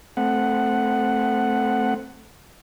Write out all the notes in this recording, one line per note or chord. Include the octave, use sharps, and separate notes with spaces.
A3 C4 F#5